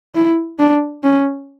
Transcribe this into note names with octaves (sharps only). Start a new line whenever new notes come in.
E4
D4
C#4